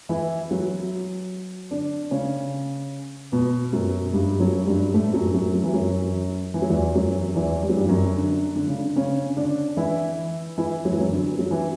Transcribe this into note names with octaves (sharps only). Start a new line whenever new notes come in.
E3 E4
F#3 F#4
D3 D4
C#3 C#4
B2 B3
F#2 F#3
G2 G3
F#2 F#3
G2 G3
A2 A3
F#2 F#3
F#2 F#3
F#3
E3
F#2 F#3
E3
F#3
E2 E3
F#2 F#3
E2 E3
G3
F#3
G2 G3
F#2 F#3
D3
D3
C#3
D3
C#3 C#4
D3 D4
E3 E4
E3 E4
F#3
E3
F#2 F#3
D3
F#3
E3